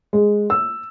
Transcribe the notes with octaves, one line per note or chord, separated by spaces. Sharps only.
G#3
E6